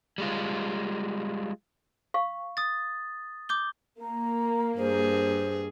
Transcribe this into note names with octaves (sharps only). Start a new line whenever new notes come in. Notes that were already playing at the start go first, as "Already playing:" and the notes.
G3 G#3 F4
F5 C#6
D#6 A6
D6 G6 G7
A#3 A#5
G2 G#4 C5